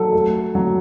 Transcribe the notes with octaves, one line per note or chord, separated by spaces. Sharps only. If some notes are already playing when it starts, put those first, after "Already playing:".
Already playing: F#3 A4
A3
F#3